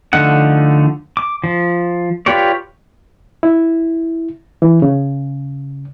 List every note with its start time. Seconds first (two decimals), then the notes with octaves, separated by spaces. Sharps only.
0.13 D3 F3 A3 D#4 F#5
1.17 D6
1.44 F3
2.26 F4 G4 B4 C#5 D5
3.43 E4
4.62 E3
4.82 C#3